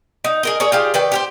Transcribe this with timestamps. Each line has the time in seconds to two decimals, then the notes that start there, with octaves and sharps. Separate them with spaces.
0.24 D#4
0.43 G#4 A#4 D#5
0.60 G#4 A#4 C#5 D5
0.72 F4 G4 G#4
0.94 D#3 B4 D5 G5
1.12 G4 A#4 C5